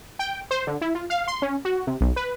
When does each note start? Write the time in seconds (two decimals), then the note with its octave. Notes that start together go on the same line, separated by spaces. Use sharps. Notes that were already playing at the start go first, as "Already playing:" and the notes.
0.19 G5
0.51 C5
0.67 D3
0.81 E4
0.95 F4
1.10 F5
1.28 C6
1.42 C#4
1.65 F#4
1.87 C3
2.01 B1
2.16 B4